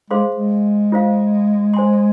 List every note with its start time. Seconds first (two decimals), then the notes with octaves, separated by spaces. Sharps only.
0.10 G#3 G#4 C5 F5 C6
0.35 G#3
0.92 F4 C5 F5
1.74 C5 G#5 C6